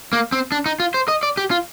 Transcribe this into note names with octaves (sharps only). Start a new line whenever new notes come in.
A#3
C4
D4
D#4
F4
C5
D#5
D5
G4
F4